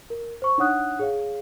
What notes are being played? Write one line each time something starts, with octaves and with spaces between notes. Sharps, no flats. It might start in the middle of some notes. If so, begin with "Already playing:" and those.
A#4
C5 C#6
D4 D#4 C#5 F#5 D#6 F#6
G#4 C#5 F5